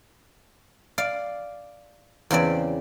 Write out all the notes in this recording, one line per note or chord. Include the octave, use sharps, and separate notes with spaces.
D5 F5
E2 C#3 C4 D5